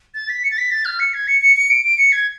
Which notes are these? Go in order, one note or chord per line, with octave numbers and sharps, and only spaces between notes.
A6
B6
C#7
A6
B6
A6
F6
C#7
G#6
C#7
C#7
C#7
D7
D7
C#7
G#6